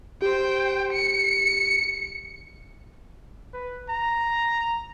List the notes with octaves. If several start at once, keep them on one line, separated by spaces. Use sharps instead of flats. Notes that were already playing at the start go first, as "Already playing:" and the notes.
G4 C5 G5
C#7
B4
A#5